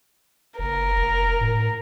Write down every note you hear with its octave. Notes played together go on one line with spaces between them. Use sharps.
F#1 A#4
F1
A2